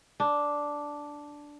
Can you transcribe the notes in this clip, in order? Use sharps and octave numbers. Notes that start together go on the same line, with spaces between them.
D4